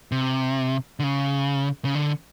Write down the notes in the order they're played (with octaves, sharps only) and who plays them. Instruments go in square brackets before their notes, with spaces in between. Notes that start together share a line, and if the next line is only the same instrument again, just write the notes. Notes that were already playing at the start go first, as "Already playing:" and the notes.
[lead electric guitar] C3
D3
C#3
C#3
D3